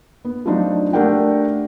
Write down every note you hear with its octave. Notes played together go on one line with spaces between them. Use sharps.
B3
F3 F#3 A3 C4 D4 D#4
A3 D4 G4 A#4 F#5 G5